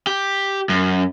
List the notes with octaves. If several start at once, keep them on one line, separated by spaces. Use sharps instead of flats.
G4
F#2